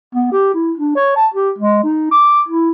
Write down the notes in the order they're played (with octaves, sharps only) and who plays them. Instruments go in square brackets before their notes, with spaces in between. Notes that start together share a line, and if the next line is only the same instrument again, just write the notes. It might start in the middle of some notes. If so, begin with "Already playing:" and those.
[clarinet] B3
G4
E4
D4
C#5
A5
G4
G#3
D#4
D6
E4